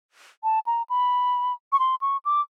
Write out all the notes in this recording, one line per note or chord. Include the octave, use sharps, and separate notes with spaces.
A5
A#5
B5
C#6
C6
C#6
D6